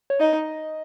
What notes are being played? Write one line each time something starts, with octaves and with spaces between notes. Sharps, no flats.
C#5
D#4 D#5